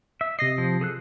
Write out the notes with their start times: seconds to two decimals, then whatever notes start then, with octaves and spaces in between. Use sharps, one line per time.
0.21 E5
0.39 C3 D#5 A#6 C7
0.58 F3
0.81 G#4 A4 F#6